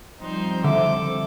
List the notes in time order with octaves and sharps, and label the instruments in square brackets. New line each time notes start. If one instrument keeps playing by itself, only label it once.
[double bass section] F3 G3 C4 [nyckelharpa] D#4 C5
[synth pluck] D3 [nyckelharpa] A4 D6 [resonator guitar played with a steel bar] E5